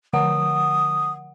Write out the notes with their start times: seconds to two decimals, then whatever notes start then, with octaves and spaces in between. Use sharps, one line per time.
0.13 D3 F3 F#5 D#6